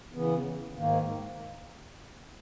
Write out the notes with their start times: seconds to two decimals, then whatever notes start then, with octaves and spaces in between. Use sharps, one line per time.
0.13 C#3 E3 B3
0.76 G#2 D#3 A#3